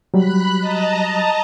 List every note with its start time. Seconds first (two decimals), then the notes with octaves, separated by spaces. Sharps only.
0.14 F#3 G3 B5 F#6
0.60 D#5 A5 A#5